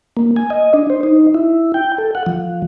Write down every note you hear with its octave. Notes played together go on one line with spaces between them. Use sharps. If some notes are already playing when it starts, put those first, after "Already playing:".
A#3
G#5
D#5
D4
C5
D#4
E4
G5
A4
F#5
F3